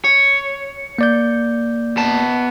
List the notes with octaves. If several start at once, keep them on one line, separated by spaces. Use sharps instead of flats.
C#5
A#3 D5 G6
B3 A5